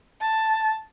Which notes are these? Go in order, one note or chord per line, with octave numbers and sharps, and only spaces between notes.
A5